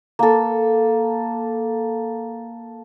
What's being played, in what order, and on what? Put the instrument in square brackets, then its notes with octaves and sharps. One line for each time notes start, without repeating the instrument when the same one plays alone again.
[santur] A#3 A4